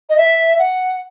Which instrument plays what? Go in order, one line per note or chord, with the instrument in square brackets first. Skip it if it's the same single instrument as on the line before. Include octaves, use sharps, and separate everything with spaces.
[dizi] D#5
E5
F#5